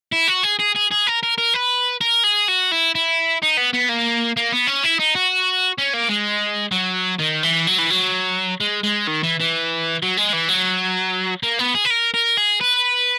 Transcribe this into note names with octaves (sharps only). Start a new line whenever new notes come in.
E4
F#4
G#4
G#4
G#4
G#4
A#4
A#4
A#4
B4
A#4
G#4
F#4
E4
E4
D#4
B3
B3
A#3
A#3
B3
C#4
E4
D#4
F#4
C#4
A#3
G#3
F#3
D#3
E3
F#3
E3
F#3
G#3
G#3
D#3
E3
E3
F#3
G#3
E3
F#3
A#3
B3
G#4
B4
A#4
A#4
G#4
B4